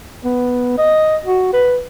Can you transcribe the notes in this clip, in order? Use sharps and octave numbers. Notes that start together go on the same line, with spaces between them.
B3
D#5
F#4
B4